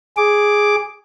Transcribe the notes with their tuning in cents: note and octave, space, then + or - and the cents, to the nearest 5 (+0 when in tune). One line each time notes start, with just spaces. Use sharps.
G#4 +0 D6 +0